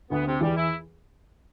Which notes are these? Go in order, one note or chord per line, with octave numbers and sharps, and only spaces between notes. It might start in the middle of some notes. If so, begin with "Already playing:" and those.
D2 D3 B3
C3
E2 E3 G3
E4